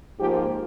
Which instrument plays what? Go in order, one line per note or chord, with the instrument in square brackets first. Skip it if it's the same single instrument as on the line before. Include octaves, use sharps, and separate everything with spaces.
[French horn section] G#2 F3 A#3 G4